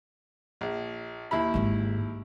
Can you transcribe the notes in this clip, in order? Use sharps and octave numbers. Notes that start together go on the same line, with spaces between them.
A#1
D#2 E4 B5
G#1 G#3